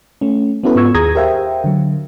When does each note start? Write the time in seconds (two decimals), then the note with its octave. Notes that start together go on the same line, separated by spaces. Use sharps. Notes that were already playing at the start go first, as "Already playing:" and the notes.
0.21 A3 C#4
0.64 B3 C#4 E4 F#4 A4 B4
0.75 G#2 B3 F4 C#6 E6 G#6
0.95 D#2 G#4 A#5 D#6 G#6 A#6
1.15 G4 A#4 C5 E5 F5 G5
1.64 D3 F#3